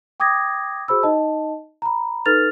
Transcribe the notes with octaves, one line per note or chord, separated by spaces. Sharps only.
G5 D6 D#6 G#6 A#6
F#4 G#4 C5 B5 E6
D#4 D#5 A5
A#5 B5
D#4 A4 B4 F6 A6 F7